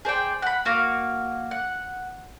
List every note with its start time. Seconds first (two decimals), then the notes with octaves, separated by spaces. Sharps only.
0.05 G#4 C5 D5 G5
0.42 F#5 B5
0.65 A#3 F#4 F5
1.51 F#5